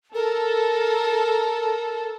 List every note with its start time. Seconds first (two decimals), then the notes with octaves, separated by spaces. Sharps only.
0.14 A4 A#4